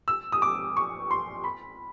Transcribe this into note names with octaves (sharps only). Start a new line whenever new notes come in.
E6
D#6
D6
C#6
C6
B5